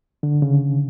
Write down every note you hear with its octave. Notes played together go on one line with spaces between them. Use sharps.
D3
C#3